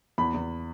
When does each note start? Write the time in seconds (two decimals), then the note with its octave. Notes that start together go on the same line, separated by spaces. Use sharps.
0.18 E2 B5
0.34 E2